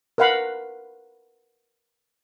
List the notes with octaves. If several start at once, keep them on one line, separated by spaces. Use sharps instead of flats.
A#4 B4 F5 F#5 B5